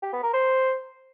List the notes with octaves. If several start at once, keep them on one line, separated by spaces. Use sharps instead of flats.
G4
B3
A#4
C5